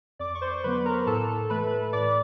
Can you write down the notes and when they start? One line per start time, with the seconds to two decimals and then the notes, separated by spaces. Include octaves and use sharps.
0.19 F2 D5 D6
0.35 C#6
0.41 C5 C6
0.64 D3 F#3 B3 B4 B5
0.85 A#4 A#5
1.06 A2 A4 A5
1.50 E3 A3 B4 B5
1.93 A2 D5 D6